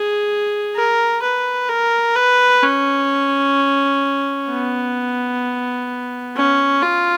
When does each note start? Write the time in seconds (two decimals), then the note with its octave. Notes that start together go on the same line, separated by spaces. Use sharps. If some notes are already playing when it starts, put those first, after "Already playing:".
Already playing: G#4
0.75 A#4
1.22 B4
1.69 A#4
2.16 B4
2.63 C#4
4.49 B3
6.36 C#4
6.82 F4